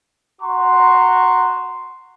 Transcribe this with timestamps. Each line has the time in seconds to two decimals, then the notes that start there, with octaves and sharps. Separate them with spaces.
0.42 F#4 A#5 C6 C#6